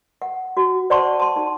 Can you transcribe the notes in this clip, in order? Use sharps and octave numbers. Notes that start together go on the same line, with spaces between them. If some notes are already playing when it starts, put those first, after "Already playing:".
F#5
F#4
C5 D5 F#5 A5 C6 C#6
A5 C6
D#4